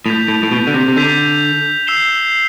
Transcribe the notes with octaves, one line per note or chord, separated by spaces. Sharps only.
A2 G6 B6 F7
A2
A2
B2
D3
C3
C3
D3 G6 B6 F7
E6 G6 C7 E7 G7